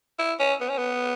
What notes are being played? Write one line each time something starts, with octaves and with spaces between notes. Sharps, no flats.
E4
C#4
B3
C#4
B3